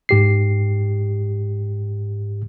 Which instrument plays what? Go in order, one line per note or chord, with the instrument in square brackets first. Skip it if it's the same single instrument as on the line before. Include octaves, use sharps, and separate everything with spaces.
[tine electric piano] G#2 G4 C7